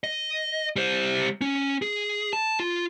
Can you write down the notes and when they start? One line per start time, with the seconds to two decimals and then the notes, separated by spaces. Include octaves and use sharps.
0.04 D#5
0.76 G3 C5
1.41 C#4
1.82 G#4
2.33 A5
2.60 F4